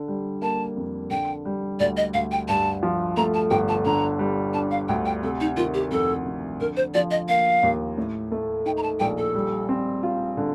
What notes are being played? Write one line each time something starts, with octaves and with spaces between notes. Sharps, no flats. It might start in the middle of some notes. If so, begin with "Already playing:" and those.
Already playing: D3
G3
A#3 A5
F2
D3 G5
G3
D2 D5
D#5
D2 F5
G5
G2 A5
F3
A3 A#5
A5
G1 G5
A5
D3 A#5
G3
D4 A5
F5
D2 G5
G5
C3 A4
D#4
D#3 F4
G4
F2 A4
F2
D3 A#4
C5
F3 D5
D#5
A#3 F5
D#2
A2
A3
D#4 G5
A#5
A5
A#1 G5
A4
G3
C4
F4
D3